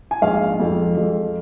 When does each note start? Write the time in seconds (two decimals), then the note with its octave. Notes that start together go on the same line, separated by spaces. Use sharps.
0.11 G#5
0.22 A#1 G#2 G#3 F5
0.60 F2 F3 G#3
0.97 F2 F3 G#3